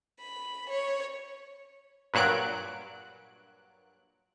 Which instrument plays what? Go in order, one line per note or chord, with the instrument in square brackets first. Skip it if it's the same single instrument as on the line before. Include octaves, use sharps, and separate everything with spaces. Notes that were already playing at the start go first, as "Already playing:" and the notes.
[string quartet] B5
C#5
[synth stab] G2 A#2 F#3 F#6 D7